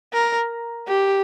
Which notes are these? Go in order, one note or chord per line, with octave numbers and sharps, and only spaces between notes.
A#4
G4